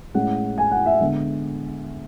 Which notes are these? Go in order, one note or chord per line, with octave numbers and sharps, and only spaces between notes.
A2 G#3 C#4 F#5
G#5
F#5
E5
D3 G#3 B3